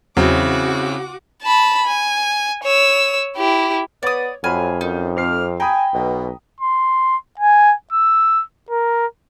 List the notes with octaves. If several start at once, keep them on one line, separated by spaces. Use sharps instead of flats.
E2 C#3 F#3 C4 E4 F#4 F#5 D6
A5 B5
G#5
C#5 E6
E4 G4
B3 C#5 D5 D#6
F2 F#3 A3 C5 G#5 B5 F6
F#2 D#4
A3 C4 D6 F6 C7
G5 G#5 A#5 B5 D#6
B1 B2
C6
G#5
E6
A#4